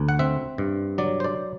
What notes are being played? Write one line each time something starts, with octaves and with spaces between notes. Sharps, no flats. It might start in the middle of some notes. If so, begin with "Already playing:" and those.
Already playing: D2
F#5
C4 E5
G2
F#3 D5
C5
D5